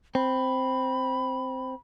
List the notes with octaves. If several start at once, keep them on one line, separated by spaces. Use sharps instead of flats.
C4 B5